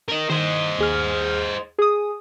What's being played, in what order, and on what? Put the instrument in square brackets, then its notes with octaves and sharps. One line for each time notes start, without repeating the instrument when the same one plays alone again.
[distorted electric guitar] A#4 D#5
[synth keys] D#3 [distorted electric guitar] C5 D#5
[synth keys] D#2 G#4 F6
G#4 D#6